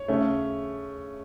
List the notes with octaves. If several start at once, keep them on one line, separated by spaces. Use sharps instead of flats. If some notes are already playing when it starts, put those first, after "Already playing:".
Already playing: C#5
C#3 A3 C#4